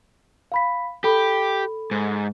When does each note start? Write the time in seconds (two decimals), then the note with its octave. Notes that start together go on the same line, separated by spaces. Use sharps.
0.52 F5 B5 B6
1.04 G4 A4 B5
1.91 G#2